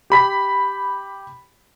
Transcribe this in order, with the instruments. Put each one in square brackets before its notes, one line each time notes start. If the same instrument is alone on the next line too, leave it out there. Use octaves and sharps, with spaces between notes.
[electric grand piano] G4 B5 B6